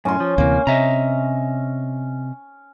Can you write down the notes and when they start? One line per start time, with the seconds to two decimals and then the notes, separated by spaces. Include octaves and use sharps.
0.05 F#2 A2 C#4 C6
0.20 F3
0.38 D2 C3 E3 A#3
0.67 C3 D#5 E5 A#5